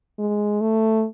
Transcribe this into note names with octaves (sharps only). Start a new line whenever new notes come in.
G#3
A3